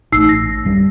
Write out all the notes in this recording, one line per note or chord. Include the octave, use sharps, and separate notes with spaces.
A1 A2 D#4 E6 C7
A#6
F#2 G3